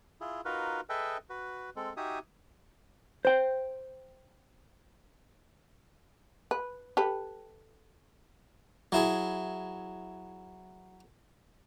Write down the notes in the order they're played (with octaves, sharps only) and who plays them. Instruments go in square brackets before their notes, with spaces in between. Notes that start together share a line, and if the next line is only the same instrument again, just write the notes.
[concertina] E4 F4 G#4
D#4 F4 F#4 A#4 B4
G#4 A4 B4 D#5 E5 G5
F#4 B4
G#3 C4 A4
D#4 F#4 G4 E5 G#5 D#6
[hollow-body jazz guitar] C5 G5
[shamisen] B4
G4 A4 B4
[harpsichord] F#3 E4 G#4